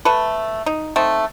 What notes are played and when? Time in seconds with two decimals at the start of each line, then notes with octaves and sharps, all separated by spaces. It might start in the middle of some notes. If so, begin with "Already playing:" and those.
0.05 A3 A4 B4
0.66 D#4
0.96 A3 C4 D#4